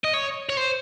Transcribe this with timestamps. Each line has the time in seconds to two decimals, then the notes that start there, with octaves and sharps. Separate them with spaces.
0.05 D#5
0.14 C#5
0.50 C#5
0.57 C5